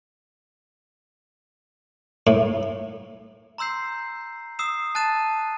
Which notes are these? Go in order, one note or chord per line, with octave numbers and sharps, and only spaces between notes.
A2
A#5 C6 E6 G6 C7
D#6 E6 C7 E7
A5 F#6 A6 D#7 E7